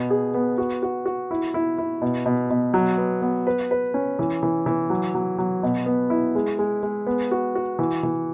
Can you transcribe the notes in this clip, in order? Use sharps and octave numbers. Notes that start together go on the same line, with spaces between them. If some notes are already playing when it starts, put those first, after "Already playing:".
Already playing: B2
G#4
B3
F#4
F#4
F#4
E4
E4
E4
B2
B2
B2
F#3
B3
B3
B4
B4
C#4
E3
E3
E3
F#3
F#3
F#3
B2
B3
E4
G#3
G#3
G#3
B3
F#4
F#4
E3
E3